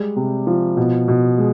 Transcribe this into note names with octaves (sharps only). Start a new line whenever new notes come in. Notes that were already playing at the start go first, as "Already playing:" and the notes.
Already playing: G3 G#3
C3
F3
B2
B2
G#3